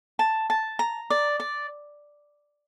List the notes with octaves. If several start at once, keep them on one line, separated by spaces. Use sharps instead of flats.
A5
A5
A#5
D5
D5